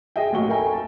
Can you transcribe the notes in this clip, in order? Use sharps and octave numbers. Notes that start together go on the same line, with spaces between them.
G#4 D#5 E5 G5
A1 D#2 F#3 C#6 G7
A4 A#4 E5 G5 G#5 A#5
A5